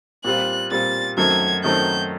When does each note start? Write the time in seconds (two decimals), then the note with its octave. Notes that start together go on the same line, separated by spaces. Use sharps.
0.25 A#2 G3 C4 F4 F#6
0.71 A#2 G3 C4 F4 A6
1.17 F#2 D#3 F#3 A3 C4 G#6
1.64 F#2 D#3 F#3 A3 C4 G6